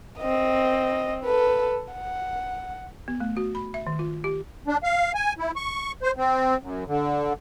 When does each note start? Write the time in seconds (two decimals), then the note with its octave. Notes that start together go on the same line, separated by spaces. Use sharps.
0.19 C4 D#5
1.24 A4 B4
1.93 F#5
3.08 B3
3.20 A3
3.37 F#4
3.55 B5
3.74 E5
3.87 D#3
3.99 F4
4.24 G4
4.67 D4
4.84 F5
5.15 G#5
5.38 E4
5.56 C#6
6.03 C5
6.17 C4
6.62 F#2
6.87 D3